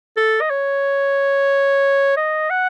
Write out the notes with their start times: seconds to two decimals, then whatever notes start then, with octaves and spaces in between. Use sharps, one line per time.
0.17 A4
0.41 D#5
0.50 C#5
2.17 D#5
2.50 F#5